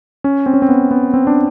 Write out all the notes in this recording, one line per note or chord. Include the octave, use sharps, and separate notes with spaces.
C#4
C4
C#4
C4
B3
B3
C4
D4